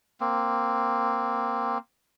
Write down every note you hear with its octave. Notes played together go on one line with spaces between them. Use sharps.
A#3 C4